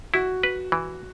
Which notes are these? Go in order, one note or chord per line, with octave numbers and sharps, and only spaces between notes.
E4 F#4
B4
E3